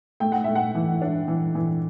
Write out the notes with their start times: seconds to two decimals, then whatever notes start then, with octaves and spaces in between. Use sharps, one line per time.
0.20 A3 G5
0.32 F#5
0.44 A3 E5
0.55 F#5
0.75 E3
1.02 D4
1.28 E3
1.55 E3